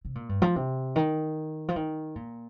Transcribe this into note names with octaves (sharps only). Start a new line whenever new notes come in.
C3
A#2
G2
F3
C3
D#3
F3
D#3
A#2